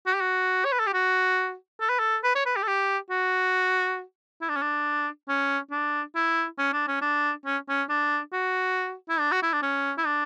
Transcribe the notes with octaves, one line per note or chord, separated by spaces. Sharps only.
F#4
G4
F#4
C#5
B4
A4
G4
F#4
A4
B4
A4
B4
C#5
B4
G4
A4
G4
F#4
E4
D4
C#4
D4
C#4
D4
E4
C#4
D4
C#4
D4
C#4
C#4
D4
F#4
E4
D4
F#4
E4
D4
C#4
E4
D4